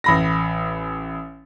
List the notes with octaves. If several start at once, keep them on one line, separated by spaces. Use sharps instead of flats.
A1 B5 A#6